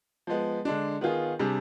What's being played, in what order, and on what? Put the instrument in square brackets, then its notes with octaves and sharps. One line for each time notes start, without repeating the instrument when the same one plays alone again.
[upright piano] F3 G#3 B3
D3 G#3 D4
D#3 B3 F4 G#4
C3 G3 D4 G#4